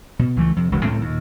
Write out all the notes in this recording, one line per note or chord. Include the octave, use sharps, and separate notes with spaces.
B2
C#2 E3 A3
F2 C3
E1 C#2
C#2 A2 A3 C4
D#2 A#2